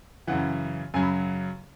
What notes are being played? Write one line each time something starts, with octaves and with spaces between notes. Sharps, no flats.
F#2 C#3 E3 F#5
F#2 C#3 F#3 G#5
B5